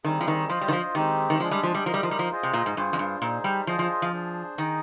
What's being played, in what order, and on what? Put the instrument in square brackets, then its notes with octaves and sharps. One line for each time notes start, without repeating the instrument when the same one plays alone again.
[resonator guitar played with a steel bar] D#3 [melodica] G3 C4 D#4 G#4
[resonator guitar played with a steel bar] F3
D#3
[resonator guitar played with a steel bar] F3 [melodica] F4 C5 D#5
[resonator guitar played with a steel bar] G3
D#3
F3
[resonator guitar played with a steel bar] D#3 [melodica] G#3 C4 D#4 G4
[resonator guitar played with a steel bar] D#3
[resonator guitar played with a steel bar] F3 [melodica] G#3 D4 G#4
[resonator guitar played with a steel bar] G3
F3
G3
[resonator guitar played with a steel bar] F3 [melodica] D#4 A#4 D#5
[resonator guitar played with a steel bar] G3
F3
G3
F3
[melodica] F4 G#4 C5 D#5
[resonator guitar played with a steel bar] C3
A#2
G#2
[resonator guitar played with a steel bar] G2 [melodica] F4 G#4 C5
[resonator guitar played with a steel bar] F2
G2
[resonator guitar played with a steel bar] A#2 [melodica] D#4 G#4 C5
[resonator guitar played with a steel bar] G3
[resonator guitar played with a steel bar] F3 [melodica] F4 G#4 C5 D#5
[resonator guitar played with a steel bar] F3
F3
[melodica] D4 G#4 C5
[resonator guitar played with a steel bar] D#3 [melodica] D#4 G#4 D#5